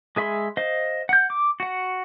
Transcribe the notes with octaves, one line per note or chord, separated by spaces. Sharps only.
G#3 G#4 E5 B5 C6
C5 D#5 F5
F#5 G6
D6
F#4 F#5